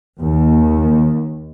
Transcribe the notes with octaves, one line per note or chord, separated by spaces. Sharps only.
D#2